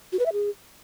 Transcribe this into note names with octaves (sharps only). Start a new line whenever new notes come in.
F#4
B4
E5
G#4